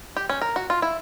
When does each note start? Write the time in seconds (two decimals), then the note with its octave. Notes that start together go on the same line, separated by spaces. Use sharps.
0.17 G4
0.30 C#4
0.42 A#4
0.56 F#4
0.70 F4
0.82 E4